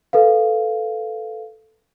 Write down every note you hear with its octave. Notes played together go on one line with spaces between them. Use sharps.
A4 B4 F5